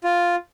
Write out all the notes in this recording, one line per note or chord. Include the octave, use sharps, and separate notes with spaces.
F4